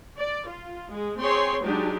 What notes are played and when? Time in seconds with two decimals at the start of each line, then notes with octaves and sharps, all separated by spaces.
0.16 D5
0.49 F4
0.90 G#3
1.20 C4 G#4 C#5 G5 C6
1.61 F#3 G#3 D4 D#4 G4